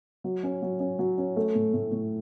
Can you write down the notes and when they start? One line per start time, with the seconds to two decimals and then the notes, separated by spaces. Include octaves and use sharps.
0.24 F#3
0.43 C#4
0.62 F#3
0.80 C#4
0.99 F#3
1.18 C#4
1.37 A3
1.55 A2
1.74 A2
1.92 A2